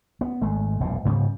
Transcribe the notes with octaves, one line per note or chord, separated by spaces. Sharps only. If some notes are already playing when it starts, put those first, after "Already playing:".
B3
G#1 G#3 A3
E1 B1 F#2 A#2
G#2 C#3 G3 B3